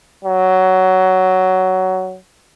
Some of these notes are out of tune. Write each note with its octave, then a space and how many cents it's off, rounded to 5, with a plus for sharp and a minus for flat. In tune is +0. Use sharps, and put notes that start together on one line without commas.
F#3 +10